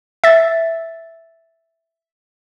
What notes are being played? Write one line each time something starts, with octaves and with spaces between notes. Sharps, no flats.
E5 A6